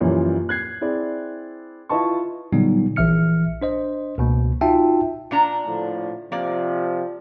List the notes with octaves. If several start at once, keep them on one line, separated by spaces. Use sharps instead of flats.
F#2 A#2 E3 F3 G3
F#6 G#6 C7
C4 E4 G#4 D5
E4 F4 B4 D#5 A5 C#6
A#2 D3 F#3 G3 B3 D#4
A#1 E3 E5 F6 C#7
D4 C5 D#5
C#2 B2 A#3
D#4 F4 F#4 E5 G5 A5
A#2 D4 A#5
A2 D3 F3
C3 F3 A#3 D5